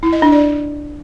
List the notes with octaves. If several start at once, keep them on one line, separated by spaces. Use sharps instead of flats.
E4
D#5
D4
D5